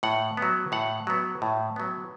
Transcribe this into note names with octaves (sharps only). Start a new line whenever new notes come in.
A2 F#5
F#3 B3
A2 F#5
F#3 B3
A2
F#3 B3